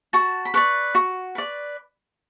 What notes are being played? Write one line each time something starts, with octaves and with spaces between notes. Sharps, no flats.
F#4 A5
B5
B4 D5 C#6
F#4
B4 D5